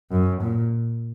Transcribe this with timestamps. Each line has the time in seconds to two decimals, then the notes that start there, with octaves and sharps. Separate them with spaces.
0.11 F#2
0.41 A#2